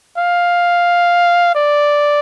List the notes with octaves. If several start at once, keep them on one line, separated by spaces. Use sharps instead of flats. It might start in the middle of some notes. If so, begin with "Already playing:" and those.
F5
D5